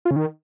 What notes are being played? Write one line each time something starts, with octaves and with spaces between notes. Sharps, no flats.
F4
C#3
D#3